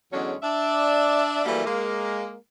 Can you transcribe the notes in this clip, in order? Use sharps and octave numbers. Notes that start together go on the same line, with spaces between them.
E2 D3 F#3 G#3 C#4 D4
D4 D5 E5
E3 F#3 G3 A3 A#3
G#3 A#3 A#4